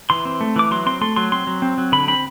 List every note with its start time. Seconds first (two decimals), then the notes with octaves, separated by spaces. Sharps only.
0.10 E3 C6
0.25 C4
0.41 A3
0.56 E3 D6
0.71 F#3 C6
0.86 C4 C6
1.01 A3 C6
1.16 F#3 C6
1.32 C4 C6
1.47 F#3
1.62 C4
1.78 F#3
1.92 D3 B5
2.08 C4 B5